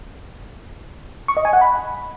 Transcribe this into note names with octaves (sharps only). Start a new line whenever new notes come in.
C#6
D#5
G#5
F#5
B5